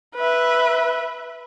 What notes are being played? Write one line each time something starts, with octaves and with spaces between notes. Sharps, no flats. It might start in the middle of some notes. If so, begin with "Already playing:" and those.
B4 E5